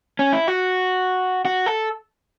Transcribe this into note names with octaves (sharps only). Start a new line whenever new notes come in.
C#4
E4
F#4
F#4
A4